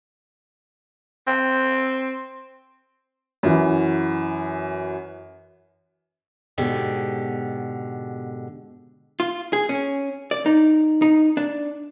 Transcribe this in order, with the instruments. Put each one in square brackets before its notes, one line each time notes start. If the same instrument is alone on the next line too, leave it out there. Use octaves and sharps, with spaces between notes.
[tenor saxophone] C4
[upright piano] F#2 E3
[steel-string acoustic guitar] G#2 B2 D3 G4
[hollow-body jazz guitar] F4
G#4
C#4
D5
D#4
D#4
D4